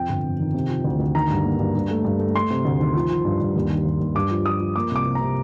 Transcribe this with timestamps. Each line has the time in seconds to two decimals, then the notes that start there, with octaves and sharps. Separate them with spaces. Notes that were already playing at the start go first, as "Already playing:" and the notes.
Already playing: F2 G5
0.09 G1
0.24 F2
0.40 D#3
0.54 C3
0.69 F3
0.84 D2
1.00 D2
1.15 D#3 A#5
1.30 G2
1.45 A#3
1.59 G2
1.74 G2
1.90 A3
2.04 G2
2.19 A3
2.35 A3 C6
2.50 C3
2.65 D2
2.79 D#3
2.95 F3
3.10 F3
3.25 G2
3.41 G2
3.56 D#2
3.70 D#3
3.85 D#2
4.00 D#2
4.15 G2 D6
4.31 F3
4.46 F3 D#6
4.60 F3
4.76 A#3 D6
4.91 C2 D6
5.06 C3
5.15 A#5
5.21 C3